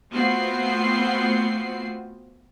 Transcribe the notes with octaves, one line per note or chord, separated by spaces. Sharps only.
A3 B3 C4 F4 F#4 C7